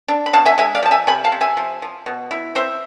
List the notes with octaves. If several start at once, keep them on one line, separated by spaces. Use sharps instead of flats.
D4
B5
B2 F5 A5
E5 G#5
G#3 E5 G#5
D5 F5
F3 A5
E5 G#5
C3 G#5 B5
F5 A5
C3
E5 G#5
F3
F3
B2
E4
C4 C5 E5